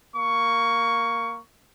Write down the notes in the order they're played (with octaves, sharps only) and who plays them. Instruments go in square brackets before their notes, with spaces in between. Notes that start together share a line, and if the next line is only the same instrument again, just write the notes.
[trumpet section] A#3 C#6